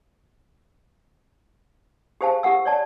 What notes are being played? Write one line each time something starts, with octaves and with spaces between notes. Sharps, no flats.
G4 G#4 C5 F5 A5
G4 A#4 F#5 E6
C#5 D5 A5